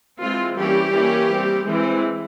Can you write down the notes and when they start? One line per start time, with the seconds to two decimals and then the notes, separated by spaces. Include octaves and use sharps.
0.20 E3 G#3 C4 F4
0.56 E3 G3 A#3 C#4 G4
0.92 E3 A#3 C#4
1.28 G3 C4
1.64 E3 G#3 C4